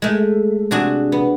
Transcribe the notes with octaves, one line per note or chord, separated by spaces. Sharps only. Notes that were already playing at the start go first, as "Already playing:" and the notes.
G#3 A3
C3 D4 F#4 G#4
B3